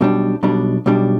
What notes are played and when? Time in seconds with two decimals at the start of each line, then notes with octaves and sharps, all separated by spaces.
0.01 B1 B2 G3 D4
0.43 B1 B2 G3 D4
0.86 B1 B2 G3 D4